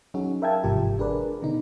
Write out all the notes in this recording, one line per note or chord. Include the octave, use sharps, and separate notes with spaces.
F#3 C#4 D#4 F#4 G#4
A#4 E5 F5 G5 A5 G#6
G1 G#2 C3 F3 F4 G4
D4 G#4 A#4 B4 D5
B2 D3 D#4